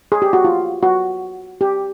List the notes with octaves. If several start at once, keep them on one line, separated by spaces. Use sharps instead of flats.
G#4
G4
F#4
F4
F#4
G4